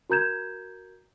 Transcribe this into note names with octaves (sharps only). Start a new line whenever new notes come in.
F#4 A#4 A#5 G6 G#6 E7